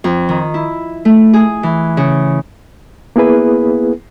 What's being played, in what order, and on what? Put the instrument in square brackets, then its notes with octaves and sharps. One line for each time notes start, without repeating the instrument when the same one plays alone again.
[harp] F2
D#3
E4
A3
G#4
E3
C#3
[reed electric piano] A#3 B3 E4 G#4 B4